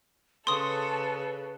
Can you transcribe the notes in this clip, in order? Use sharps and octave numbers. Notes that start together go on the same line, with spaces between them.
C#3 A4 B4 C6 D#6